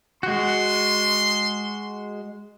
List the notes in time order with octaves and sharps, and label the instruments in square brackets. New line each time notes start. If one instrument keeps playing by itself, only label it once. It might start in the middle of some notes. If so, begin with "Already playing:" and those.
[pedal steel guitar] G#3 F#4 [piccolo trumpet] C6